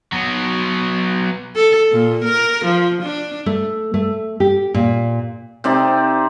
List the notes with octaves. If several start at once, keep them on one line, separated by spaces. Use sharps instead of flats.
F#3 B3
A4
A#2
A#4
F3
D4
A3
A3
G4
A#2
C3 C4 D#4 D5